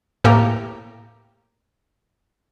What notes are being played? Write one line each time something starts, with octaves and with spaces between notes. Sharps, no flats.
A2 A#3 G4 A4 G5 A#5